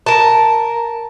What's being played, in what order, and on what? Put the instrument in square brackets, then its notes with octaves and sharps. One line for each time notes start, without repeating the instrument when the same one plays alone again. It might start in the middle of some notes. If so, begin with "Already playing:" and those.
[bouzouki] A#4 A5